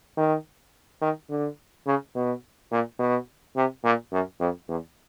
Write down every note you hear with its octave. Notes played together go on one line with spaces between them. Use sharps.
D#3
D#3
D3
C#3
B2
A#2
B2
C3
A#2
F#2
F2
E2